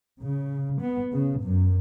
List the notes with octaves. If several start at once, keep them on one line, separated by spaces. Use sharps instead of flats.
C#3
B3
C#3
F#2